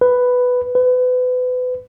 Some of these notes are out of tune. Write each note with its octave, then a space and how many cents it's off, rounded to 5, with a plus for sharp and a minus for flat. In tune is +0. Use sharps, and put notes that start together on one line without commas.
B4 +5
B4 +30